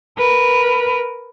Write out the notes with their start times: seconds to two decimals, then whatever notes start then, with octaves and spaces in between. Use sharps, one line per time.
0.18 A#4 B4